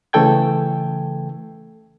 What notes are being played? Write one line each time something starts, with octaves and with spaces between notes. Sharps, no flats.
C#3 E3 A3 A4 G5 G#6